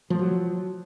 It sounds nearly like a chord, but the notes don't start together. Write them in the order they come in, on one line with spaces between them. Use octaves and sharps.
F3 A3 F#3